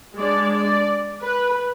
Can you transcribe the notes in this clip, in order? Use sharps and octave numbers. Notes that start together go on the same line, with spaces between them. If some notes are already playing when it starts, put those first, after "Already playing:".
G#3 D4 D5
D5
B4